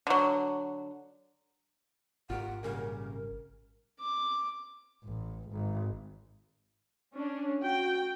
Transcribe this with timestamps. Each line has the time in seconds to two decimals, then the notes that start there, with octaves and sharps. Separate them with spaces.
0.07 D3 F#3
2.30 G#1 F4 G4 A#4 F#5
2.63 A#2 C#3 G3 A#4
4.00 D6
5.04 A1
5.51 G#1
7.14 C#4 D4
7.61 F#4 G5